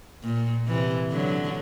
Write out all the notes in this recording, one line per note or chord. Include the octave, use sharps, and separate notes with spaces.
A#2
C3 E3
D3 F#3